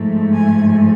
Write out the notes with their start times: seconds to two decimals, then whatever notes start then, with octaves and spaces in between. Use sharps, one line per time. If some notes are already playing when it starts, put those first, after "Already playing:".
Already playing: G#2 F3 A3
0.35 G#5